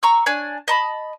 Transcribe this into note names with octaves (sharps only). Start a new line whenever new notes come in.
A#5 C#6 E6
D4 C#5 G#5
D#5 A5 B5